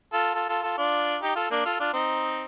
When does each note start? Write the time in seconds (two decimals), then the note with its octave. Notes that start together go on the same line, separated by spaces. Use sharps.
0.13 F4 A4
0.34 F4 A4
0.49 F4 A4
0.63 F4 A4
0.78 D4 F4
1.22 D#4 G4
1.36 F4 A4
1.50 A#3 D4
1.65 F4 A4
1.80 D4 F4
1.94 C4 D#4